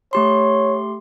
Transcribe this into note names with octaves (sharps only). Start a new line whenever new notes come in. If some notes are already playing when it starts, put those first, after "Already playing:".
A3 G4 C#5 C6